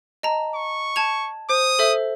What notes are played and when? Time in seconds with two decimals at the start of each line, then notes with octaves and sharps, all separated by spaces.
0.23 D#5 A5 A#5
0.54 C#6
0.96 A5 G#6 F7
1.49 C5 D#6
1.79 A4 C5 E5